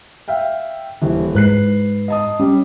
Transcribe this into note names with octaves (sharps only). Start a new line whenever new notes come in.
E5 F5 G5
D#1 E3
G#2 B4 F#6 C7
D#5 A5 D#6
G3 C#4